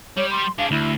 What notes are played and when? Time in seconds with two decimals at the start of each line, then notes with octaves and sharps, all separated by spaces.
0.17 G3 G4 C#5
0.31 C6
0.58 G#3 D4 F5
0.71 D2 E4